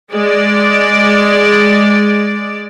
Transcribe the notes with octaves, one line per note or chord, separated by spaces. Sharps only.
G#3 D5